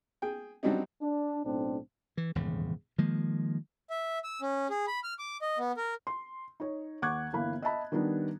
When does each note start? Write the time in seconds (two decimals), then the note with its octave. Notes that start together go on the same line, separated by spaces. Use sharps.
0.22 G#4 G5
0.63 F#3 G3 C4 D4 D#4
1.02 D4
1.45 B1 A2 C4 D4
2.17 E3
2.35 D#1 E2 G#2 C#3
2.98 D#3 F3 G#3 A#3
3.90 E5
4.24 E6
4.42 C#4
4.70 G#4
4.87 B5
5.04 F6
5.19 D6
5.42 D#5
5.58 B3
5.77 A#4
6.07 C6
6.60 D#4 C#5
7.02 D#2 F#5 C#6 D6 F#6 G#6
7.33 G1 E3 A#3 F5 B5
7.62 D#5 E5 A5 B5
7.92 D#3 G3 B3 D4 D#4